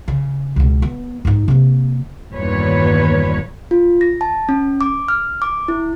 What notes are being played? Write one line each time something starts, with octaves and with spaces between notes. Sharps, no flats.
C#3
C#2 B2
B3
G#2 D#4
C3 A#3
E2 G2 A#2 D#3 B4 C#5
F4
A#6
A5
C#4
D6
F6
D6
E4